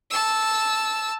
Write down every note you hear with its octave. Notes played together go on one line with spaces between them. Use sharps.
A5 E6